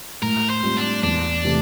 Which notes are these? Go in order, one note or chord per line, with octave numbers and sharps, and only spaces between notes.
A2 A#4
C5
G3 C4 F4
D4
E2 D4
C3 E3 A3